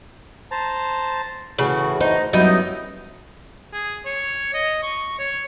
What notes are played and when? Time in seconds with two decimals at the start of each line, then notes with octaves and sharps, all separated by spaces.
0.51 C5 A5 A#5
1.59 A2 C#3 E3 F#4
2.01 D#4 C5
2.33 F#2 F#3 G3 B3 D#4 E4 D#5 G5
3.73 G#4
4.05 C#5
4.54 D#5
4.83 C#6
5.19 C#5